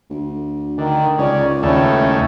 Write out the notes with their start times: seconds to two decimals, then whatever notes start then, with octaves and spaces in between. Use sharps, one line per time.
0.10 D2
0.78 D3 D#3
1.18 C#2 C#3 D5
1.63 D#2 A2 C#3 A3